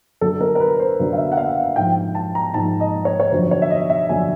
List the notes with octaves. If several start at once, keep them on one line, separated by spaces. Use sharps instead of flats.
F#2 D3 F#3 A4
A#4
A#4
B4
C5
F#2 D3 F#3
F5
E5
F#5
F5
G#2 F3 G5
A5
A#5
G#2 F3 A5
D#5
C#5
C#5
F#2 D3 F3 C5
C#5
E5
D#5
E5
F#2 D3 F3 G#5